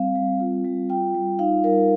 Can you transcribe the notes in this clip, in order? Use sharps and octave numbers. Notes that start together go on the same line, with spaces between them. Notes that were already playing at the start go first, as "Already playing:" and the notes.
Already playing: G3 C4 F5
G3
F4
G3
F4 G5
G3
D#4 F5
G3 A#4